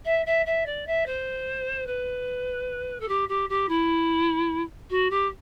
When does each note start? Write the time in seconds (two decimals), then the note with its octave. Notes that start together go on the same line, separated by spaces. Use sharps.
0.05 E5
0.26 E5
0.46 E5
0.65 D5
0.86 E5
1.06 C5
1.86 B4
3.00 A4
3.08 G4
3.28 G4
3.49 G4
3.68 E4
4.90 F#4
5.10 G4